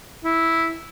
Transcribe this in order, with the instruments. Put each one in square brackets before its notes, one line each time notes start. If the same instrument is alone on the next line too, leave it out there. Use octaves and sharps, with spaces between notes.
[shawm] E4